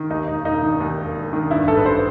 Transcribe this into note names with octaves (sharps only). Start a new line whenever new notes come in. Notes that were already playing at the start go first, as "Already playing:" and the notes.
Already playing: D#3
D#2 D#4
E1 D#4
E1 D#4
D#3
D#2
E1
E1
D#3
G2 E4
A1 A4
B4
C5